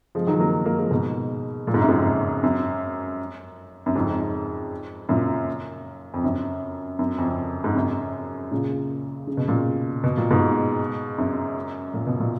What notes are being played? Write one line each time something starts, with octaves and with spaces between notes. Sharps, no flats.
F3 G#3
D#3 F#3
F#3 A#3
F#3 A#3
F3 G#3
G#2 B2
A#2
G#2
F#2
F2 G#2
F#2
F#2
F2 G#2
F#2 A#2
F2
F#2
F#2
F2
G#2
F#2
A#2 C#3
C#3
B2
A#2 C#3
B2
A#2
G#2 B2
F#2
A#2
B2
A#2